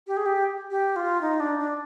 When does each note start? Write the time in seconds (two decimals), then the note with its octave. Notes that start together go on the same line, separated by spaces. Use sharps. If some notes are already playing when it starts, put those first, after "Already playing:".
0.07 G4
0.17 G#4
0.26 G4
0.70 G4
0.96 F4
1.21 D#4
1.40 D4
1.59 D4